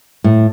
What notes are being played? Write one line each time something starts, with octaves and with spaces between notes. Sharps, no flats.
A2